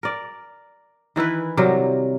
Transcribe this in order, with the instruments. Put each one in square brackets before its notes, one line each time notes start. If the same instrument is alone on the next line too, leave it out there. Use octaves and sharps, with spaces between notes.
[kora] A#4 D5
D#3 E3 E4 B4
C3 F#3 G3 A#4